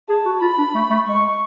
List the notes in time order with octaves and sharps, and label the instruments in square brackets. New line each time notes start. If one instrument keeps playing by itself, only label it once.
[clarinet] G#4 [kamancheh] A5
[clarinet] F#4
[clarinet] F4 [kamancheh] B5
[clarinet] D4
A3
A3
[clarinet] G#3 [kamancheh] C#6